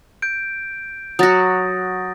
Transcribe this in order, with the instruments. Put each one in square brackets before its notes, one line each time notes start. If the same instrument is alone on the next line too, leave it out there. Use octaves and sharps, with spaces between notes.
[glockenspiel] G6 D7
[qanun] F#3 F#4 [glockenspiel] D#6 A6 A#6